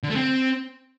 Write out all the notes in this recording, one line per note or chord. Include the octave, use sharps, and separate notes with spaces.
D3
A3
C4